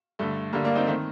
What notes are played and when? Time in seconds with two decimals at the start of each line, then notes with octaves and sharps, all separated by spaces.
0.19 G2 D3 A3
0.53 G2 D3 G3 A#3
0.64 A#3 D4
0.75 C4 D#4
0.87 D#3 A3 C4